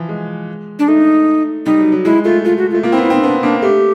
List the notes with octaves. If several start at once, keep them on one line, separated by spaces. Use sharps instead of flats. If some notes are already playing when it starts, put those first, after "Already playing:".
Already playing: E3 F3
G#3
D4
A3 D#4
G3 D#4
F#3
F#3
G#3 E4
A3 F4
A3 F4
F#4
F4
A3
A#3 F4
C4 E4
B3
E4
C4 D#4
B3 D4
A#3 D4
A3 G4